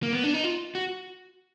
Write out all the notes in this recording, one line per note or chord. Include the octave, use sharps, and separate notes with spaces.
A#3
B3
D4
D#4
F4
F#4